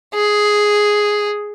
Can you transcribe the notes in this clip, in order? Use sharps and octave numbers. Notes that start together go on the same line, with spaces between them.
G#4